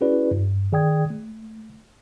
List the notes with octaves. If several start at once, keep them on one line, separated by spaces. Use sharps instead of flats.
C#4 E4 F#4 G#4 B4 D5
G2
D#3 G#4 D5 G5 D#6 G#6
A3